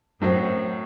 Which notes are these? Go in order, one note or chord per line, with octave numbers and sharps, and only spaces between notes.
F#2 A2 F#3 C4